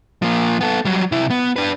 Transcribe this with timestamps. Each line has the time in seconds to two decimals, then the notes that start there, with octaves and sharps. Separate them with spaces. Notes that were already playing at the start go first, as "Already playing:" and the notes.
0.22 F3 A#3
0.61 B3 A4
0.85 F#3 G3
1.12 C3 E4
1.30 B3
1.56 D4 B4